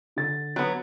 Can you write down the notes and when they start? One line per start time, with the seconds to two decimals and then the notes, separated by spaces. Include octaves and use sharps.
0.16 D3 A6
0.56 F#3 B3